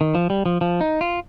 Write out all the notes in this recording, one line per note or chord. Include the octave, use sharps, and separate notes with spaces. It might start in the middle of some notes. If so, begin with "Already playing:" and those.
D#3
F3
G3
F3
F3
D#4
F4